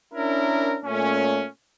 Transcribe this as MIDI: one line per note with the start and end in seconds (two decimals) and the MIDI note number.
0.14 0.79 61
0.14 0.79 62
0.14 0.79 64
0.14 0.79 70
0.85 1.46 46
0.85 1.46 57
0.85 1.46 61